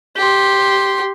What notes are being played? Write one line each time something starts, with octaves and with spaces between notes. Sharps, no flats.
G4 C6